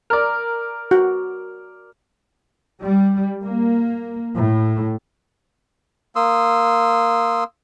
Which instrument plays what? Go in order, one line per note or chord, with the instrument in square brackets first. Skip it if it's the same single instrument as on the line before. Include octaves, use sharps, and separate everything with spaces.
[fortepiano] A#4 D5
[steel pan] F#4
[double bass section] G3
A#3
A2
[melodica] A#3 C6 D#6 E6